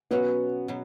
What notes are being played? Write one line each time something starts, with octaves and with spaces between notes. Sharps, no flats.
B2 F#3 B3 C#4 F#4
B2 F#3